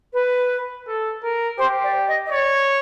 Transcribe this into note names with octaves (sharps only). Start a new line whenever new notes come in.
B4
A4
A#4
G4 C5
D5
D#5
D#5
C#5 D5